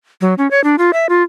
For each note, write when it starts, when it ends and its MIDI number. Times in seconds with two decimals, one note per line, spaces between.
0.21 0.34 54
0.38 0.49 61
0.51 0.63 73
0.64 0.76 62
0.78 0.91 65
0.93 1.07 76
1.09 1.23 65